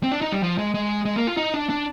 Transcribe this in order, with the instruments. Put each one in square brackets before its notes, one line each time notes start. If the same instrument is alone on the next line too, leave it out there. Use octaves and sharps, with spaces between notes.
[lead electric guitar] C4
D4
D#4
G3
F3
G#3
G#3
G#3
A#3
F4
D#4
D4
D4